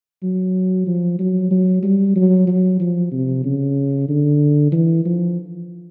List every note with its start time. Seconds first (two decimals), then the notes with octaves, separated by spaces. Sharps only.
0.23 F#3
0.87 F3
1.19 F#3
1.51 F#3
1.83 G3
2.16 F#3
2.48 F#3
2.80 F3
3.12 C3
3.45 C#3
4.09 D3
4.72 E3
5.05 F3